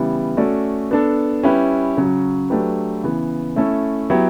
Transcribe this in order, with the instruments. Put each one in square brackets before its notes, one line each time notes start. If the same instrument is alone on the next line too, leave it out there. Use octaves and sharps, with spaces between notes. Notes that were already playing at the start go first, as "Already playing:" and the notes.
Already playing: [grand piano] C#3 E3 G3 B3 E4
A3 C#4 F#4 A4 D5
B3 D4 A4
G3 C#4 E4 G4 B4
C#3 F#3 C#4
F#3 A3 D4 G4 B4
C#3 E3 B3
A3 C#4 E4 A4
F#3 B3 E4 G4